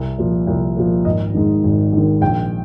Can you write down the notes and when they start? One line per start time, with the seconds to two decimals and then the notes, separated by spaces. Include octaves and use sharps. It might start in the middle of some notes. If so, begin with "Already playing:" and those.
Already playing: C2
0.18 A#2 F3
0.47 C2
0.77 A#2 F3
1.05 G#1 D#5
1.34 G#2 D#3
1.64 G#1
1.92 G#2 D#3
2.21 A#1 G5